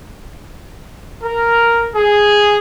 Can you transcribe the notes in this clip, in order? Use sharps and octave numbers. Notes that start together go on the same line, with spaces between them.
A#4
G#4